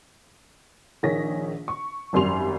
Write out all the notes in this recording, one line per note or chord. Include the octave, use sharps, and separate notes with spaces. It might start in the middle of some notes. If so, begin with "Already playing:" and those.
A#1 D#3 G#4 C#5 A#6 B6
C#6
G#1 F#2 G3 C6 F7